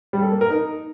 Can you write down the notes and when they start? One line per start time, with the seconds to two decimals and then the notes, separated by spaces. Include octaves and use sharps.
0.13 G3
0.22 A4
0.32 A#3
0.41 A#4
0.50 D#4